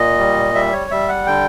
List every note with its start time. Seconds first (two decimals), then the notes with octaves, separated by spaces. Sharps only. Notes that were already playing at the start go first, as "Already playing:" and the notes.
Already playing: A#2 D#5
0.18 G3
0.54 G3 E5
0.73 C#5
0.91 G3 E5
1.09 F#5
1.27 D3 G5